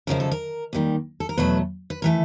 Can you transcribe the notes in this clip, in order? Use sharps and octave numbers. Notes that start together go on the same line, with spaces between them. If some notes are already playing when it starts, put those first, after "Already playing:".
F#2 C#3 F3 G#3 A#4
A4
A#4
D#2 D#3 G3
A4
A#4
E2 B2 F#3 A3 B4
B4
E3 A3 A#4